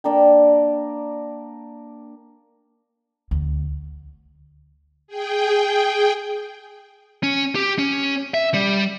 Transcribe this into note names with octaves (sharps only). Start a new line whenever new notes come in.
A#3 D4 A#4 G5
D2
G#4 G5
C#4
G4
C#4
E5
G3